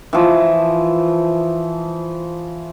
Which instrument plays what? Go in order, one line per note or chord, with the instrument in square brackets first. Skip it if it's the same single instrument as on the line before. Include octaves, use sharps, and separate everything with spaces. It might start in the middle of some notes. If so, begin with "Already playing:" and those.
[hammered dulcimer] E3 F3